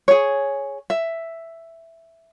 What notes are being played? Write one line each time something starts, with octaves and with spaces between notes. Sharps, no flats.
G#4 C#5
E5